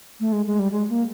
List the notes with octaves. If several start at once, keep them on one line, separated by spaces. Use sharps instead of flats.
A3
G#3
G#3
G3
G#3
A#3